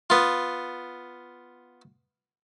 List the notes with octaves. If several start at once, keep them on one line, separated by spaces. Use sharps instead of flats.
B3 F4